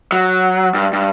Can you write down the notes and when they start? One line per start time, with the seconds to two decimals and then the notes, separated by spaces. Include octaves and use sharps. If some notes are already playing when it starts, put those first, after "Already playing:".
0.12 F#3
0.74 G2
0.93 G2